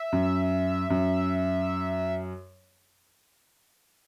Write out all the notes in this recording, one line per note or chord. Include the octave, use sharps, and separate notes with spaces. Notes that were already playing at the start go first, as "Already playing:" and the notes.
Already playing: E5
F#2
F#2